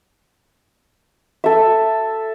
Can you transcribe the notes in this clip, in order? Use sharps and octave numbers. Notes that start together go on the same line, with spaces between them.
A4 E5